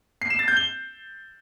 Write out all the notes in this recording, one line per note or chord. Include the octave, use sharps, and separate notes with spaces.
C7
E7
A6
G6
G7